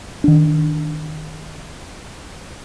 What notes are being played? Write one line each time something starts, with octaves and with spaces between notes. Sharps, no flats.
D#3 D4